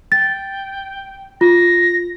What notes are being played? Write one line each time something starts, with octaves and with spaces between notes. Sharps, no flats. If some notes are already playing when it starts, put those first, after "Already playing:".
G5 A6
F4 A#6